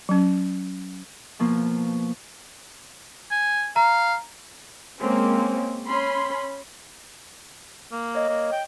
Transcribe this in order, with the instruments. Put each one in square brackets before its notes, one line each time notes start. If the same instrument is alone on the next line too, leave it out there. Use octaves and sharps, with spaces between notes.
[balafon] F#3 C#4
[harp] B2 F3 A#3
[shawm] G#5
[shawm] F5 [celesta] A#5
[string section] G#3 A#3 C4 C#4
C#4 B5 C6
[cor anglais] A#3
[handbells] C#5 D#5
[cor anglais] A#3
G5